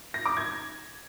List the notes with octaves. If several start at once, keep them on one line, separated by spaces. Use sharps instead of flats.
A#6
D6
G#6